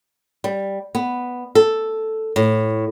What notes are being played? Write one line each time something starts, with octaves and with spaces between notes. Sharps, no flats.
G3
B3
A4
A2